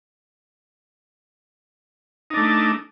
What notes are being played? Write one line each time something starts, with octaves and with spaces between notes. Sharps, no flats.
A3 D4 D#4